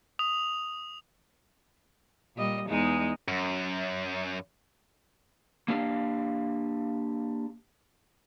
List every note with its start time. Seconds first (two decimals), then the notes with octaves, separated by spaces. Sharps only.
0.19 D#6 F7
2.36 A#2 G3 D#5
2.67 E2 G#3 D#4
3.28 F#2
5.68 A#3 D4 G4 F5